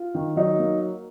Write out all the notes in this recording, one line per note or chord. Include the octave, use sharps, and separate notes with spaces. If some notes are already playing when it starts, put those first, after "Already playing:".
Already playing: F4
D#3
F#3 D#4
A#3